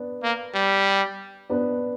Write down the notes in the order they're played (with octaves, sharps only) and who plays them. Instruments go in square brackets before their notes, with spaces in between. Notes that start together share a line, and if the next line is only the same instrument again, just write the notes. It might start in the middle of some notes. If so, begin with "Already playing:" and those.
Already playing: [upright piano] B3 D4
[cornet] A#3
G3
[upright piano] B3 D4